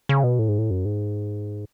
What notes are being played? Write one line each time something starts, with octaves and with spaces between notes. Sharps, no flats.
C#3
B2
A2
G#2
A2
F#2
G#2